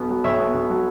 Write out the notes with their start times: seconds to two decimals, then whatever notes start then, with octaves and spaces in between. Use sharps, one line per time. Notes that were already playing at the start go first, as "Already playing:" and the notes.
Already playing: B1 B2 B3
0.09 F#3
0.24 B1 C#5 E5
0.39 B3
0.54 B2
0.70 F#3